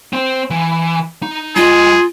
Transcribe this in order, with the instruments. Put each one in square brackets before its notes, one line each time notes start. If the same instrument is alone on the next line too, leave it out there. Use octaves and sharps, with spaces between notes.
[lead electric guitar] C4 C5
E3
D#4
[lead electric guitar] G3 D#5 [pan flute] F4 [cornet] G#4